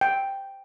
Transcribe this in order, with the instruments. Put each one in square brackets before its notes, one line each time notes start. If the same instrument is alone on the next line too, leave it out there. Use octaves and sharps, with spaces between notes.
[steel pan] G5